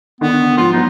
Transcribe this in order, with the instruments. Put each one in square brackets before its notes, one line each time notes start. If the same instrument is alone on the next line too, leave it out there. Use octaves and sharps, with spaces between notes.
[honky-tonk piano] D3 D#3 [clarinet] B3
[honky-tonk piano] G#2 F3 [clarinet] F4
[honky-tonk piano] F#3 B3 [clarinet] D#4